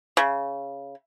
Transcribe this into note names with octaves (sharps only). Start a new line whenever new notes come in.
C#3